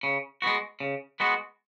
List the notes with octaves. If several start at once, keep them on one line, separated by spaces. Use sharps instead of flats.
C#3
G#3 B3 F#4
C#3
G#3 B3 F#4